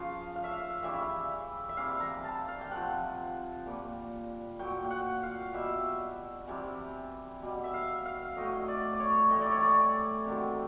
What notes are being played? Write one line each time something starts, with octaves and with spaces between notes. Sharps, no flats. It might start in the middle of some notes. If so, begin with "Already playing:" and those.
Already playing: C#3 F3 F5
F5
E5
F5
C#3 E3 G3 E5
E5
C3 E3 G3 F5
A#5
A5
F5
G5
C3 F3 F#5
A#2 G3
A#2 F#3 G5
G5
F#5
F5
B2 G3 E5
C3 E3 G3
B2 G3
E5
F5
F5
A2 F#3 D#5
D5
D5
C#5
A2 E3 G3 D#5
D5
C#5
D5
C3 D#3 F#3